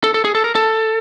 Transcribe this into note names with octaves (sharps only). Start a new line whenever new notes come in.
A4
A4
G#4
A4
A#4
A4